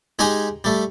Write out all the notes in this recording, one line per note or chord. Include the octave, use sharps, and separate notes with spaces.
G#3 D#4 G4 D#5 G#5 A#5
G3 A3